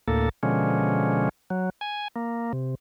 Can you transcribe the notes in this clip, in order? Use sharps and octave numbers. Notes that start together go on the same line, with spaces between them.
D2 A2 A#3 A4
B2 D3 F3 G#3 C#4
F#3
G#5
A#3
C3